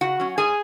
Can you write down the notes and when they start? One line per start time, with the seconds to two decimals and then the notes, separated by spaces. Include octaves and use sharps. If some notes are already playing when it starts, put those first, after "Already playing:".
0.01 C#3 F#4 F#5
0.20 F#3 C#4
0.38 G#2 G#4 G#5